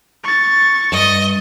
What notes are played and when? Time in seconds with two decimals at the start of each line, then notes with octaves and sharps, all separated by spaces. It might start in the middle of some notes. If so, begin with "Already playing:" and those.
0.23 C#6 A6
0.92 G2 D#5